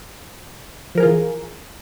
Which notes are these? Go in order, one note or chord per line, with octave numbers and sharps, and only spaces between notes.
E3 F3 F4 G#4 A#4